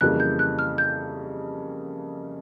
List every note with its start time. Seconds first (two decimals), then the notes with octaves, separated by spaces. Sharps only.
0.01 F2 C#3 E3 G3 A#3 F#6
0.20 G6
0.39 F#6
0.59 F6
0.78 G6